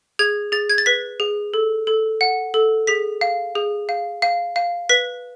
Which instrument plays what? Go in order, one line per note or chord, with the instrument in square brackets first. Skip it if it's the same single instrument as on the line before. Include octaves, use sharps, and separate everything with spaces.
[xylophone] G#4 G#6
G#4 A6
G#6
A6
B4 B6
G#4
A4
A4
F#5
A4
G#4 B6
F5
G#4
F5
F5
F5
B4 B6